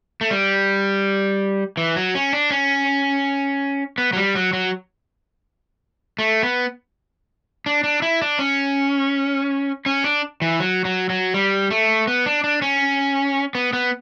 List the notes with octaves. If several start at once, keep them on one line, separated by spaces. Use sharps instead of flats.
A3
G3
E3
F#3
C#4
D4
C#4
B3
F#3
G3
F#3
F#3
A3
B3
D4
D4
E4
D4
C#4
C#4
D4
E3
F#3
F#3
F#3
G3
A3
B3
D4
D4
C#4
B3
B3